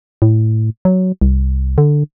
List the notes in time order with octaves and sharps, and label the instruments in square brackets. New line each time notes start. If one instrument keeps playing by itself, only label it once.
[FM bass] A2
F#3
C2
D3